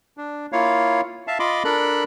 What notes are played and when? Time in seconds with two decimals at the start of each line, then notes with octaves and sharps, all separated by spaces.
0.17 D4
0.52 A#3 E4 F4 C#5 F5
1.27 E5 F5 A5
1.39 F4 D#5 B5 C6 D6
1.65 D4 A4 A#4 B5 F#6